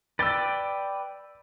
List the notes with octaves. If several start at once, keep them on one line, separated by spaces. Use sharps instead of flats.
B4 D5 G5 E6 A6